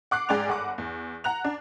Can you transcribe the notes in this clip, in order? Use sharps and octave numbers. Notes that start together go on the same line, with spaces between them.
F#5 D6 F#6 C7
G#2 G#4 D5 G5 D6 F7
G1 F#5 D6
E2
F#5 A#5 F#6 F7
D4